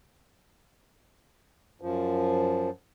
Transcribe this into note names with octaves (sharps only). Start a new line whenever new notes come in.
F#2 F3